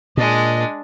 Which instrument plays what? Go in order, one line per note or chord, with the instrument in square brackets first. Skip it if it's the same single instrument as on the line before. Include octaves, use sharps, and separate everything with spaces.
[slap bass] A#2 [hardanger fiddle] G#3 D4 [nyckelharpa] D#5